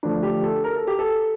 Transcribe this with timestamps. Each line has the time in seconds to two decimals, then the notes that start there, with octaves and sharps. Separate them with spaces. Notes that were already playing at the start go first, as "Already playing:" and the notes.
0.03 D3 F3 A3 D4
0.23 G4
0.44 A4
0.64 A#4
0.76 A4
0.87 G4
0.99 A4